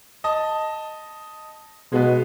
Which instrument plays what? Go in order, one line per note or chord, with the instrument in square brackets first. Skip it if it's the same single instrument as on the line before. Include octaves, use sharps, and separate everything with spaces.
[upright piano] D#5 A5
[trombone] B2 [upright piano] G#3 B3